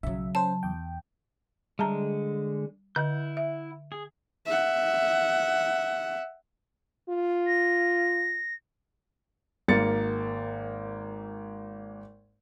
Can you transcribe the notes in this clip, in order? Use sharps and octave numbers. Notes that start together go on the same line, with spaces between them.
B1 C#3 F#3 E5
C#4 C5 A5
E2 G5
D3 G3 G#3 A5 A#5
D3 E4 D#5 F#5 G6
E5
G#4
E5 F#5
F4
A#6
G#1 A#3 A6 C#7